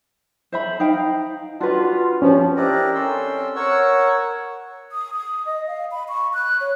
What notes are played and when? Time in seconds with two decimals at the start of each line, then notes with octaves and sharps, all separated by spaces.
0.52 C5 E5 B5
0.80 D#4 F5 G5
1.61 D4 F4 F#4 B4
2.22 G2 F3 C#4
2.57 D4 E4 G4 A#4 D5 D#5
2.94 C4 C#4 A4 C6 E6
3.56 A#4 C#5 F#5 C#6 E6
4.92 D#6
5.14 D#6
5.46 D#5
5.67 F5
5.92 B5
6.09 C#6
6.34 F#6
6.61 C#5